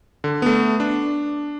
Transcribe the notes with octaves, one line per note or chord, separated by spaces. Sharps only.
D3
A3 B3
D4